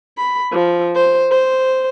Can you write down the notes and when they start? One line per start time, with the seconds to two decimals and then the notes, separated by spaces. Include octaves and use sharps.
0.18 B5
0.52 F3
0.96 C5
1.31 C5